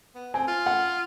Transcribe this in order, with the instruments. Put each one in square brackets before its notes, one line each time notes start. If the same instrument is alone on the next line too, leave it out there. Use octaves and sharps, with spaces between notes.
[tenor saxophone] B3
[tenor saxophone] C4 [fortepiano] G#5
[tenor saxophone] F4
[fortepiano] F#5